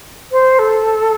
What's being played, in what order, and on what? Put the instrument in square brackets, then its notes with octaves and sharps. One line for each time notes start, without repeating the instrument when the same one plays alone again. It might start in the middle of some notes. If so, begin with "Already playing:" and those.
[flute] C5
A4